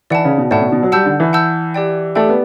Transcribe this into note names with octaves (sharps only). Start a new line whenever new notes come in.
E3 D5 F#5 A5
C#3
B2
A2 D5 F#5 A5
B2
B2
F#3
G3 F#5 A5 E6 G6
D3
E3
F#5 A5 E6 G6
G4 D5 G5
A3 G4 D5 G5
B3